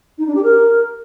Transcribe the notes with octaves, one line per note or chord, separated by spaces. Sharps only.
D#4
D4
G4
A#4